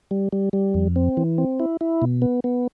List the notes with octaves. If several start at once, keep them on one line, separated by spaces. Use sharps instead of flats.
G3
G3
G3
F2
C4
E3
C4
E4
E4
B2
B3
B3